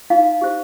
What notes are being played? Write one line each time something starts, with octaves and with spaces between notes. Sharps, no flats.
D#4 F5
G4 C5